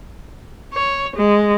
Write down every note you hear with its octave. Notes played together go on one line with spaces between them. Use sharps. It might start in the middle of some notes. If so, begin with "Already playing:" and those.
C#5
G#3